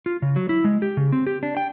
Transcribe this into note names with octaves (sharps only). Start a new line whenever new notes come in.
F4
C#3
F#3
E4
G#3
G4
C#3
C4
G4
D4
G5